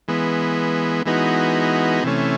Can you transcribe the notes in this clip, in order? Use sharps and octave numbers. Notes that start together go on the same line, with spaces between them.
E3 G#3 B3
E3 G#3 B3 D#4 F#4
C3 E3 A3 C#4